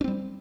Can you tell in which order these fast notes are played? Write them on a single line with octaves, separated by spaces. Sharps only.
D4 C4 G3